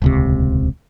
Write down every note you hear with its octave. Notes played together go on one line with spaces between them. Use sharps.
D#1 C#2 C3